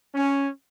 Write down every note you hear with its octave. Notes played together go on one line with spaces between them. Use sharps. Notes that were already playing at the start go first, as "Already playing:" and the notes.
C#4